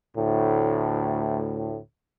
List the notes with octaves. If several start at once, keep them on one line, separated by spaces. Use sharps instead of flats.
D2 A2